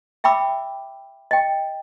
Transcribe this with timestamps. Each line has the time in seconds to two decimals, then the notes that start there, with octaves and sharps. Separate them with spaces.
0.24 E5 G5 B5 D6 E6
1.31 D#5 G5